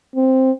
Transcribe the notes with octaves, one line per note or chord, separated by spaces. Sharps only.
C4